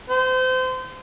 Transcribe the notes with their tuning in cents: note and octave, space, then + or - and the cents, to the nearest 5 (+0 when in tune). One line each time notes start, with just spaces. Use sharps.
C5 -30